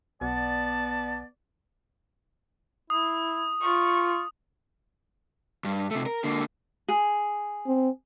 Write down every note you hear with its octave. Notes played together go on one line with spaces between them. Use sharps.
B1 B3 D5 A5
E4 D#6
F4 C#6
G2
C3 A3
A#4
D3 A#3
G#4
C4